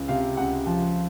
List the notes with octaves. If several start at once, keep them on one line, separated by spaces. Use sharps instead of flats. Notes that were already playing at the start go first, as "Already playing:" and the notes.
Already playing: C#2
C3 F5
C#2 F#5
F3